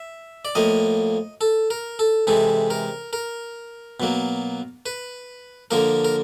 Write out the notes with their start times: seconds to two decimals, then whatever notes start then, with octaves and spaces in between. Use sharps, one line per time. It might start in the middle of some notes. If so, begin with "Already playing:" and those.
Already playing: E5
0.45 D5
0.55 A2 F3 A#3 D#5
1.41 A4
1.70 A#4
1.99 A4
2.27 C3 E3 G#3 A4
2.70 A#4
3.13 A#4
4.00 B2 F#3 A#3
4.86 B4
5.71 D3 F3 A#3 A#4
6.04 A#4